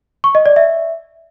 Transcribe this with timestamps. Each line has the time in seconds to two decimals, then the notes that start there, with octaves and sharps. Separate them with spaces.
0.24 C#6
0.35 D#5
0.46 D5
0.56 E5